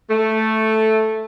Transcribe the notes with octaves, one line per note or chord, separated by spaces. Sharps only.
A3